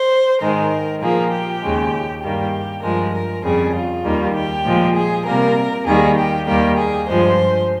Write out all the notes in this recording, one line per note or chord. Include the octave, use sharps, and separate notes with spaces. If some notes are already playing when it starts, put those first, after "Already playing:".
Already playing: C5
G#2 D#3 G#3 A#4
A#2 F3 A#3 G#4
G4
D#2 C#3 G#3
G2 D#3 G3 A#3 G4
G2 F3 G#3 A#4
A#4
F2 C#3 G3 G#4
F4
D#2 D#3 G3 A#3
G4
A#2 F3 G#3
G#4
C3 G3 A#3 A#4
D#2 D#3 G3 A#3 G#4
G4
D#2 D#3 G3 A#3 G4
G#4
G2 F3 G#3 C5